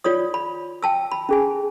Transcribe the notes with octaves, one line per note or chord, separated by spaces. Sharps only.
F4 C#5 D5 D#6
B5
G5 A5 E6
B5
C#4 G#4 G#5